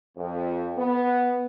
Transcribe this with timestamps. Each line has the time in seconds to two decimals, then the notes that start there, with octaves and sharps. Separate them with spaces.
0.17 F2
0.77 B3